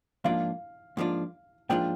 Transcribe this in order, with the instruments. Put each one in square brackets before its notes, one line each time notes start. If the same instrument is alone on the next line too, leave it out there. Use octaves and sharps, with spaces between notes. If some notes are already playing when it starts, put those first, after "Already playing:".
[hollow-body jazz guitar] G#2 F3 A#3 D4 F4 [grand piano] F5
[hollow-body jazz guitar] G#2 F3 A#3 D4 F4
[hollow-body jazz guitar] G#2 F3 A#3 D4 F4 [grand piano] G5